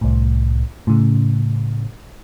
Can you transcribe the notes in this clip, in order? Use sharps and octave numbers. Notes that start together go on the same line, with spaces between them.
C2 A2
A2 C#3